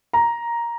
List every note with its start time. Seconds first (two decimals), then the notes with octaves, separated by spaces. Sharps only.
0.13 A#5